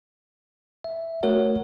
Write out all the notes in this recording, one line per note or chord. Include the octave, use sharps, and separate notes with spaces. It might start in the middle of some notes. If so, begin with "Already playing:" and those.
E5
A3 F#4 A#4 C#5 F#5